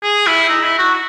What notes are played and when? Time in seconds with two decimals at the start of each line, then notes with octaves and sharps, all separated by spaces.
0.03 G#4
0.27 E4
0.49 D#4
0.64 E4
0.79 F#4